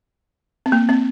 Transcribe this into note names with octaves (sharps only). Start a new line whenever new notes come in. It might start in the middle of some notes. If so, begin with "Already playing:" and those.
C4
A#3
C4